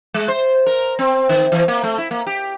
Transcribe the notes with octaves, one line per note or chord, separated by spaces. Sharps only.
G#3
C5
A#4
C4
D#3
E3
A#3
A3
E4
A#3
G4